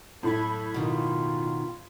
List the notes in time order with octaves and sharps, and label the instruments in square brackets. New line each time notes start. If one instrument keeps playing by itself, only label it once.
[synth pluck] F#2 B5 G#6 [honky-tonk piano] A2 [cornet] A4
[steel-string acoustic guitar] B2 D#3 [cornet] F4